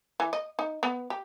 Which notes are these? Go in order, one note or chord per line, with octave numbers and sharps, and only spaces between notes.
E3
D#5
D#4
B3
G4